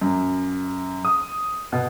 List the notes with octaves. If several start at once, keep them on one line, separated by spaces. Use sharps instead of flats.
F#2
D#6
B2